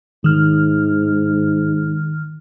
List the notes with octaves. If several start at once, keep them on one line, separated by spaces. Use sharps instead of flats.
G#2 D#3 F6